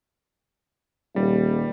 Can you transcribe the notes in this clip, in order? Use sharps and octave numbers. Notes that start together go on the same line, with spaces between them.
D#1 G3